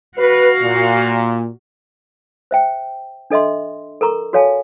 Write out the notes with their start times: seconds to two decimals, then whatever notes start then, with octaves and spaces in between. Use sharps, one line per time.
0.18 F#4 B4 F5
0.62 A#2
2.51 C5 E5 G5
3.31 D4 A4 D#5 E5 C6
4.01 A4 A#4 A#5 C#6
4.33 F#4 A4 C#5 F5 G#5 A5